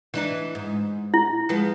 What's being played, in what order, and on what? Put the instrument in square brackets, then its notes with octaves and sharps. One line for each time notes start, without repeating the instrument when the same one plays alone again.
[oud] E3 D4 D#4
G#2
[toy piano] E4
[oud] F3 G#3 B3